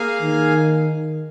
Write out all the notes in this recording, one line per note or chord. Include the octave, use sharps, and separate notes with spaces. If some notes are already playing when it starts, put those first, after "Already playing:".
Already playing: A#3 G#4 F5 G#5
D#3